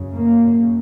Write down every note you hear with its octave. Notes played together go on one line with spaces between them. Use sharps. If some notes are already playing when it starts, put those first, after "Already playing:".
Already playing: F#2 C#3
A#3
F#2 C#3